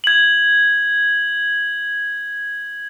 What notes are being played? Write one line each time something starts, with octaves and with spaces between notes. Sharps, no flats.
G#6 F#7